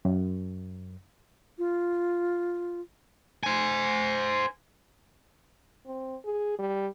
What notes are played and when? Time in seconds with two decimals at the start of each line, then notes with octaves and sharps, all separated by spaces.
0.05 F#2
1.58 F4
3.43 C5 G#5
5.87 C4
6.25 G#4
6.59 G3